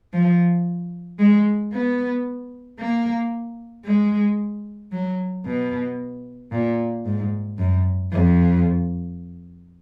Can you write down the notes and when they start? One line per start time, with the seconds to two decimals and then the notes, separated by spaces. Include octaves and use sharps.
0.13 F3
1.19 G#3
1.73 B3
2.79 A#3
3.86 G#3
4.92 F#3
5.46 B2
6.52 A#2
7.05 G#2
7.58 F#2
8.12 F2